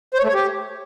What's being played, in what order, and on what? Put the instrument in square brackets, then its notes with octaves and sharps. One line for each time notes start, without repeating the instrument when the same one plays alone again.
[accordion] C5
C#5
A3
C#5
G4